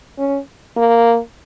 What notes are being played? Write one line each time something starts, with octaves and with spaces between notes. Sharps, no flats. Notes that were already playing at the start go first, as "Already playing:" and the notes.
C#4
A#3